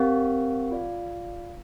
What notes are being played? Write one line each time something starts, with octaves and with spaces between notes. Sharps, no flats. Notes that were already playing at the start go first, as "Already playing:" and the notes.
Already playing: C4 G4 A#4 F5
F4 D5 F5